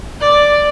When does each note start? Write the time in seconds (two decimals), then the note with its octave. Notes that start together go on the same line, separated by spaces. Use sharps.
0.20 D5